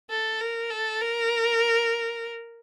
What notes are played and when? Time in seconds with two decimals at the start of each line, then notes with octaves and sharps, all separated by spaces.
0.10 A4
0.40 A#4
0.71 A4
1.01 A#4